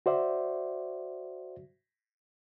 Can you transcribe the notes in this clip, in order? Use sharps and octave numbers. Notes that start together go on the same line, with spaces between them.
F#4 C5 D5 E5